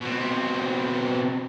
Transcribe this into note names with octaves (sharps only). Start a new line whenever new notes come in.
B2 C4